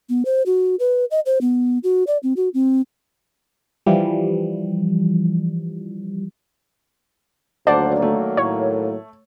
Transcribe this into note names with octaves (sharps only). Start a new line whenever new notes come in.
B3
C5
F#4
B4
D#5
C5
B3
F#4
D5
C4
F#4
C4
E3 F3 G3
D2 D#3 F#3 A#3 C5 D5 F#5 A5
A3
A2 C#5